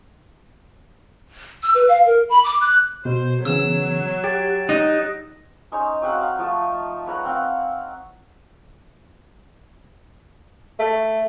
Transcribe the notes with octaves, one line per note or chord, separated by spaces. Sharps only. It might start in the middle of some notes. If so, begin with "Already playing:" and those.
E6
B4
F5
A#4
B5
D6
F#6
B2 C5
C#3 E3 F#3 B3 E6 E7
G4 A6 D7
D#4 F#6 A#6
C#4 D#4 C5 C#5
F#3 C4 F5 F#5
F5 C#6
F3 A3
B4 C#5 F#5 A#5
C4 F5 F#5
A3